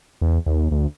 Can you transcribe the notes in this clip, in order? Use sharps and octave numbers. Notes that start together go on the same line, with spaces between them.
E2
D#2
D2